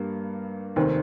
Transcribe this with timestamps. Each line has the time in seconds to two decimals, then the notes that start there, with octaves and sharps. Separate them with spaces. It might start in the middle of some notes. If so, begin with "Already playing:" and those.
Already playing: G2 G3 A#3
0.76 F1 D#2 D#3 C4